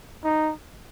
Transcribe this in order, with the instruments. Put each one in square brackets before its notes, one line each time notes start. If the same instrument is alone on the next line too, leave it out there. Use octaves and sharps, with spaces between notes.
[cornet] D#4